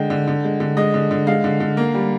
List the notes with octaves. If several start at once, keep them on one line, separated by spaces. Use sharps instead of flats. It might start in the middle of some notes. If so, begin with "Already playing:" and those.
Already playing: D3 G#3 G5
D3
D3
G#3
D3
G#3 D#5
D3
D3
G#3 F5
D3
D3
A#3
G3